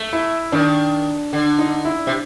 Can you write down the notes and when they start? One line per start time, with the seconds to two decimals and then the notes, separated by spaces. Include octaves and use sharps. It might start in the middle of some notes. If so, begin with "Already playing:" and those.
Already playing: A3
0.13 E4
0.52 D#3 D4
1.33 D3
1.59 D#4
1.85 E4
2.07 C3